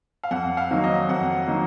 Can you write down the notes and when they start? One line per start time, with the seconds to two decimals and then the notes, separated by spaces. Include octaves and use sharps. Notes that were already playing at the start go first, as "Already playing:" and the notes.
0.24 F5
0.31 F2 F#5
0.57 F5
0.71 D#3 F#3 A#3 D#4
0.84 D#5
1.09 F2 F#5
1.48 D#3 F#3 A#3 D#4